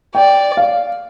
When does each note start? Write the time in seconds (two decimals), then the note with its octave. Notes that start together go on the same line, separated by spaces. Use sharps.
0.15 D5 G5
0.57 F5